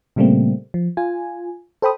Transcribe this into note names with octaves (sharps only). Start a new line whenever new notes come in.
A#2 C#3 G3 A3 A#3 C4
F3
F4 G#5
A4 C5 G5 B5 D#6